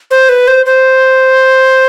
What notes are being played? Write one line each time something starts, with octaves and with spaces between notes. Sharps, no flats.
C5
B4
C5
C5